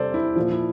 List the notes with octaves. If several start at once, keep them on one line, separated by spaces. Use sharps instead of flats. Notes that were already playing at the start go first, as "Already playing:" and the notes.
Already playing: C3 G3 G4 A4 C5 D5
E4
A#2 F3
E4